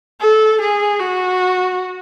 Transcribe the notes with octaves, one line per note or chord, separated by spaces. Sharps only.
A4
G#4
F#4